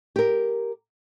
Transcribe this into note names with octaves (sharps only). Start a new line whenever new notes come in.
G4 A#4